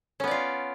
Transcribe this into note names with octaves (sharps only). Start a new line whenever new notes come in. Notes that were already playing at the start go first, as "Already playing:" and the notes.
B3 C#4 F4 D5